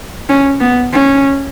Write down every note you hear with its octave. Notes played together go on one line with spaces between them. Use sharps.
C#4
B3
C#4